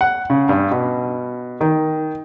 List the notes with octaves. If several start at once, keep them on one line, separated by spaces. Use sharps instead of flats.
F#5
C#3
G2
B2
D#3